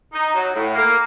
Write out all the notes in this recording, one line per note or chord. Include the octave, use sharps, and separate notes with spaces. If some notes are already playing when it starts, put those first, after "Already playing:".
D#4
F#3
A2
A#3